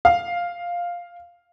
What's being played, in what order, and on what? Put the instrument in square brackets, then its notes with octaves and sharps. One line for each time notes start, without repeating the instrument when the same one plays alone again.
[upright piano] F5